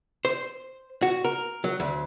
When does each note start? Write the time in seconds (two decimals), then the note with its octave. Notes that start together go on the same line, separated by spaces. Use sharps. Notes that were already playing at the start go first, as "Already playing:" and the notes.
0.25 C5
1.02 F#4
1.25 A#4
1.64 F#3
1.80 D2